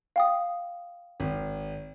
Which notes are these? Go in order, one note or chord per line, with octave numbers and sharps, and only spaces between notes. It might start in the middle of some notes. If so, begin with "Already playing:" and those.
F5 G5 D#6
G#1